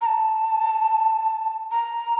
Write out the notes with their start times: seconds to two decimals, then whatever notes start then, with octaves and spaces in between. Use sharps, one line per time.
0.02 A#5
0.06 A5
1.71 A#5